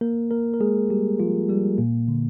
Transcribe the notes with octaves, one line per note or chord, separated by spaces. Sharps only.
A#3 A#4
A#3 A#4
A#4
G#3 G#4
G3 G4
F3 F4
G3 G4
A#2 A#3
D3